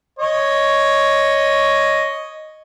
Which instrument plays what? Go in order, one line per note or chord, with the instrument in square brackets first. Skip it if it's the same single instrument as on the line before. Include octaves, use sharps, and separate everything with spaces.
[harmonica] C#5 D#5